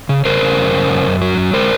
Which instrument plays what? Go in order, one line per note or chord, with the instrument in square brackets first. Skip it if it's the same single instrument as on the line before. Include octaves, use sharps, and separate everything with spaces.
[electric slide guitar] C#3
C#3 A#4 C5
C#3
F#2
C#3
F#2
F#2
F#3
F#2
G#3 A#4 C5